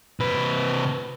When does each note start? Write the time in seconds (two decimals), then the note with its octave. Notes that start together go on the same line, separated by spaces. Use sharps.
0.20 C3 B4